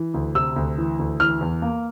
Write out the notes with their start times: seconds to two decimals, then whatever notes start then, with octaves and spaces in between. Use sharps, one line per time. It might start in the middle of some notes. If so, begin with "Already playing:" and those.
Already playing: E3
0.14 D2
0.35 C3 E6
0.56 D2
0.78 E3
0.99 D2
1.20 E3 F6
1.41 E2
1.62 A#3